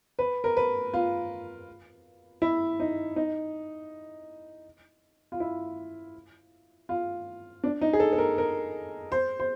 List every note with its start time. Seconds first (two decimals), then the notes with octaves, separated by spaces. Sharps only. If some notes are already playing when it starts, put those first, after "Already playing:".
0.19 B4
0.44 A#4
0.57 B4
0.94 F4
2.42 E4
2.80 D#4
3.16 D#4
5.32 F4
5.40 E4
6.89 F4
7.64 D4
7.81 D#4
7.93 G#4
8.00 A4
8.13 A4
8.18 A#4
8.38 A#4
9.12 C5
9.40 C5